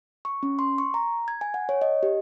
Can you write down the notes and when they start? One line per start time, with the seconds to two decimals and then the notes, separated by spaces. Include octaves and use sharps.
0.25 C#6
0.43 C#4
0.59 C6
0.78 C#6
0.94 A#5
1.28 G#6
1.41 G#5
1.54 F#5
1.69 C#5
1.82 D#5
2.03 G4